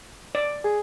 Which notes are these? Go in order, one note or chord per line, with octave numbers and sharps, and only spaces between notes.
D5
G#4